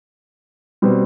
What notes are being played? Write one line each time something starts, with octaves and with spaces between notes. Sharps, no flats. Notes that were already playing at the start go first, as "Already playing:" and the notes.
B2 G3 C4